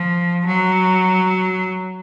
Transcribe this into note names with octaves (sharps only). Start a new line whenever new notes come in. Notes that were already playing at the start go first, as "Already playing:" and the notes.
Already playing: F3
F#3